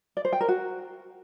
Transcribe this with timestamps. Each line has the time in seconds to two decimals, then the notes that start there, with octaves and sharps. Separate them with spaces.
0.17 D5
0.25 C5
0.33 G5
0.41 A#4
0.48 F#4